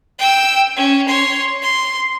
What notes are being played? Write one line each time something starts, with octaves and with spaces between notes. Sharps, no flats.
G5 E6
C#4
C#5 C6
C6